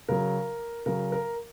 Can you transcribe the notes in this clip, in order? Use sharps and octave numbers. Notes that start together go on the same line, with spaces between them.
C#3 F#3 A#4
C#3 F#3 A#4
A#4